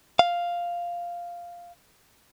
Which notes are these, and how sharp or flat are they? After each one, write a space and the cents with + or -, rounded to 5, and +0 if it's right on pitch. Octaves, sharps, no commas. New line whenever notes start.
F5 +0